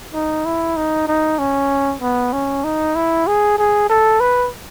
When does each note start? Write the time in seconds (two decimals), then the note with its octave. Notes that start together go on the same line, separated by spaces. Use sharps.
0.14 D#4
0.45 E4
0.77 D#4
1.08 D#4
1.39 C#4
2.02 B3
2.33 C#4
2.64 D#4
2.96 E4
3.27 G#4
3.58 G#4
3.90 A4
4.21 B4